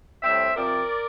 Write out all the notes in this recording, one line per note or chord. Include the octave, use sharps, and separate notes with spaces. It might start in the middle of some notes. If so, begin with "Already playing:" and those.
A2 G3 C4 C5 E5
C3 F3 C4 A#4 D5